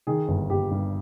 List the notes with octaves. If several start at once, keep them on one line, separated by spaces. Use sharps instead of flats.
D#3 G#4
G1
G1 G4
G2